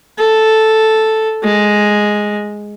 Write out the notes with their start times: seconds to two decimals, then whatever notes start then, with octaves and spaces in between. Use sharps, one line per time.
0.18 A4
1.43 G#3